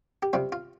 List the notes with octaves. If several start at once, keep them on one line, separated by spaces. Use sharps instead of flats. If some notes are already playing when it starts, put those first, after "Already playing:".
G4
C3 G3 C4 F4
F4